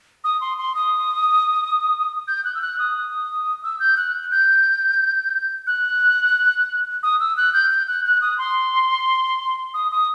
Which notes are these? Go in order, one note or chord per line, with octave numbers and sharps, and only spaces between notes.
D#6
C6
C6
D#6
G6
F#6
E6
F#6
D#6
E6
G6
F#6
G6
F#6
D#6
E6
F#6
G6
G6
F#6
F#6
D#6
C6
D#6
D#6